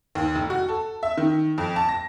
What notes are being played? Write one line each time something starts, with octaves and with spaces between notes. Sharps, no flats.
D#2
F1
F#4
A4
E5
D#3
F2
A5
A#6